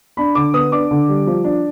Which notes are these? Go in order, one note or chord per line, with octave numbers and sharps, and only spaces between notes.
D4 B5
D3 D6
B3 D#6
D4 D6
D3
G3
F3
D4